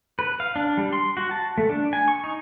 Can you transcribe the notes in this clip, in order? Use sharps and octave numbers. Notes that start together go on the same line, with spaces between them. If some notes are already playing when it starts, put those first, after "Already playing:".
B4
F5
D4
G3
C6
F#4
A5
A3
D4
G#5
C#6
D#4